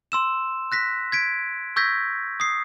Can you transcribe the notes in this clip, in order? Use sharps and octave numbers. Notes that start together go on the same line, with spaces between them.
C6 E6 E7
F#6 A#6 B6
G#6 B6 D7
C#6 E6 G6 G#6 A#6 B6
D#6 C7